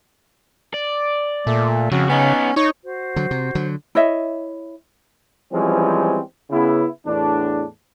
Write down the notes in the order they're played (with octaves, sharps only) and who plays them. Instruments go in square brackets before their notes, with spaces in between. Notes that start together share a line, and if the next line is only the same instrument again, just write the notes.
[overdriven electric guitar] D5
[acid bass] A#2 [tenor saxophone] A3
[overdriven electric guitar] F2 [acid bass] C#3 [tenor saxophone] F#4
[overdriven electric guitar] B3 D#4 [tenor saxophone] C#4
[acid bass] D#4 [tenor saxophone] C#5
[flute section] F#4 C5
[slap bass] D3 F#3
C3
D3 F#3
[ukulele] E4 C#5 D#5 E5
[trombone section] E3 F3 G3 G#3 C4 C#4
C#3 B3 E4
E2 A2 D4